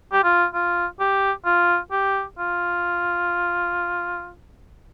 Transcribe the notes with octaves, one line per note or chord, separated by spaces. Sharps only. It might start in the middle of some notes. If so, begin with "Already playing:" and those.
G4
F4
F4
G4
F4
G4
F4